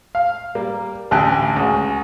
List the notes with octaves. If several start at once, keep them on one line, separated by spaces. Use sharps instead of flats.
F5
G3 A#3
A1 D2 G5 G#5 F#6
C#2 F#4